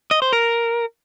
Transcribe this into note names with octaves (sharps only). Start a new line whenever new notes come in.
D#5
C5
A#4